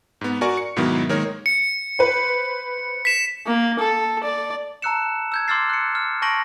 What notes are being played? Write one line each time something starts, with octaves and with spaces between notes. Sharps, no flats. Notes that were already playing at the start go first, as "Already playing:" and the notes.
G#2 B3
F#4 A#4 D5 G#5 A#5 C#6
C#7
G#2 B2 D#3 F#3 B3 E4
D#3 G#3 A#3 G#4 A#4 C#5
C#7
B4 C5
B6 E7
A#3
A4
D5
A5 A#5 E6 F#6 C#7 E7
E6 G6 G#6
C6 D6 E6 F6 A6 C7
F#6 C#7
F6
A5 C#6 G6 A#6 D7 F#7